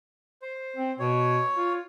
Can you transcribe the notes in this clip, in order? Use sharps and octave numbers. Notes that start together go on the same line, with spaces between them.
C5
C4
B2 C#5
F4